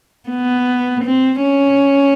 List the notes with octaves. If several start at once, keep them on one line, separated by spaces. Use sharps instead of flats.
B3
C4
C#4